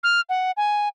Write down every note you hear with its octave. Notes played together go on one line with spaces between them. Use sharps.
F6
F#5
G#5